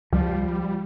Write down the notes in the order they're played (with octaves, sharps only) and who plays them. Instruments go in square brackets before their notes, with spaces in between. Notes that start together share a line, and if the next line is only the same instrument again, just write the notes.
[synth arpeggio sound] C#2 [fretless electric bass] F3 [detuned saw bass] G3